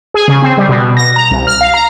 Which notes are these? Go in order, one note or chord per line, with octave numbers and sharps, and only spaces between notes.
G#4
C#3
C4
G3
B2
A#6
A#5
C2
F6
F5
A#5